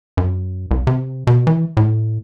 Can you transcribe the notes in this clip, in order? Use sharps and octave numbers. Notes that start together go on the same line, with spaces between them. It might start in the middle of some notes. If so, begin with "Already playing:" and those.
F#2
C2
C3
B2
E3
A2